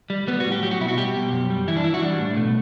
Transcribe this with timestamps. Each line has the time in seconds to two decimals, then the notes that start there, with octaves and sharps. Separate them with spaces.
0.10 G3
0.27 G3 B3
0.40 F#4
0.46 A2
0.52 G4
0.63 F#3 G4
0.71 F#4
0.80 B2 E4
0.88 F#4
0.98 G3 G4
1.15 B2
1.32 F#2
1.50 G3
1.67 E3 E4
1.76 D4
1.84 E3 E4
1.94 F#4
2.02 G3 D4
2.19 A2
2.37 B2 A3